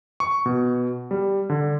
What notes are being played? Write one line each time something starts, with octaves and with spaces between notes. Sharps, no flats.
C#6
B2
G3
D3